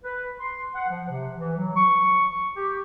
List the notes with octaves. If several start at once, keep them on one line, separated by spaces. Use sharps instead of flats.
B4
C6
F#5
F3
C3
E3
F#3
C#6
G4